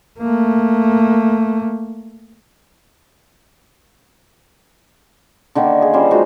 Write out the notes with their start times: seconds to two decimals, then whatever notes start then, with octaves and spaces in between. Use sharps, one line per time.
0.19 A3 A#3
5.55 D3 D#3 A#3 D#4
5.82 G#4
5.94 F3 G3 C#4 C5
6.11 F3 G#3 D#4 F#4